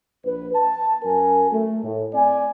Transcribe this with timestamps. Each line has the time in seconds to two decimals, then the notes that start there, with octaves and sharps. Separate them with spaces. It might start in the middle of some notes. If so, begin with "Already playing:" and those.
0.25 A#1 B4
0.55 A5
1.03 F#2 A#4 G#5
1.52 A3
1.84 A2
2.14 C4 D5 G#5